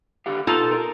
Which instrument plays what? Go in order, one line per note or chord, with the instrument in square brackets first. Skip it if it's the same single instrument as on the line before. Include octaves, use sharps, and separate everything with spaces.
[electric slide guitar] D3 G4 F5
[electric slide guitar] B2 [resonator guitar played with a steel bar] D#4 F4 A4
[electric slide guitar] A#4